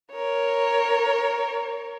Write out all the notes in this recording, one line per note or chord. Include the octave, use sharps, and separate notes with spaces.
A#4 C#5